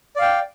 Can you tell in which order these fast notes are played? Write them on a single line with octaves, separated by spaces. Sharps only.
D5 F5 G5